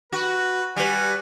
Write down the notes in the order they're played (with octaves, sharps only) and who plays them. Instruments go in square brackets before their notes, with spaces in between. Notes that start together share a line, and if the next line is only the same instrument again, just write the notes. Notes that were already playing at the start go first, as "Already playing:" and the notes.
[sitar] F#4 [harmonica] B4
[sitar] G3 B4 [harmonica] F#4 G#5